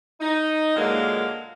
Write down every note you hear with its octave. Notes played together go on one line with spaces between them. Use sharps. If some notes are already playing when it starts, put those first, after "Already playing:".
D#4
A#2 D3 F#3 G#3 A#3